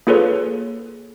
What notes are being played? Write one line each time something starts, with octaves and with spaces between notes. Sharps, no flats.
A#3 F4 G#4 A4 B4 C#5